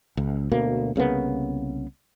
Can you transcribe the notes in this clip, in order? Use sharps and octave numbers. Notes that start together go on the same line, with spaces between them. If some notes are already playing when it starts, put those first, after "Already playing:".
C#2
D2 B2 A#3
C2 C#3 A#3 B3